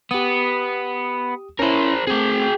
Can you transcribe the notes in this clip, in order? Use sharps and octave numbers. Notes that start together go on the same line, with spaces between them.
B3 G4 D#6
C#4 E4 A#4 C5
A3 C4 G#4 G5